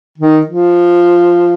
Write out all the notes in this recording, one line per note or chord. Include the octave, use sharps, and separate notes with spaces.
D#3
F3